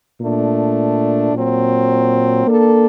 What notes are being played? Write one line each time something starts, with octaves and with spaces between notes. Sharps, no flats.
A#2 A3 D4
A#2 F#3 C4
A#3 D4 A4